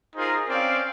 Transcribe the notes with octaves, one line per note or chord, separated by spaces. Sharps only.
D#4 F4 G#4 A#4 C5
C4 C#4 D5 F5